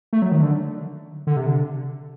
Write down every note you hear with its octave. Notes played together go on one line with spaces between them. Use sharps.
A3
F#3
D#3
D3
D3
C3
D3